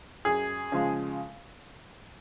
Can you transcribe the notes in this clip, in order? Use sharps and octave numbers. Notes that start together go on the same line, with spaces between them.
F#2 G#4
C#3 F3 G#3